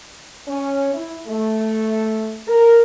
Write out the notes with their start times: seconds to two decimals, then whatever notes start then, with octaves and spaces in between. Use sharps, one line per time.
0.48 C#4
0.94 E4
1.27 A3
2.47 A#4